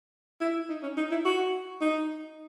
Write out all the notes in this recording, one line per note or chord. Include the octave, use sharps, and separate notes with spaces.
E4
D#4
C#4
D#4
E4
F#4
D#4